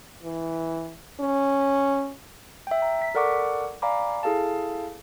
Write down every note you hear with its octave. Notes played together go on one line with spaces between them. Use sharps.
E3
C#4
E5 G5
A#5
B6
A4 A#4 D5 F#5 C#6 D6
D5 F5 G#5 A#5 B5 D6
E4 G#4 A4 F5 A5